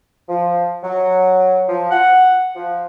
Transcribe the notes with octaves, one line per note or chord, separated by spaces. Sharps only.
F3
F#3
F3
F#5
F3